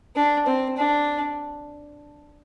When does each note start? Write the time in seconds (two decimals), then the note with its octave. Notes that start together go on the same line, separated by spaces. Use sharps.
0.16 D4
0.47 C4
0.77 D4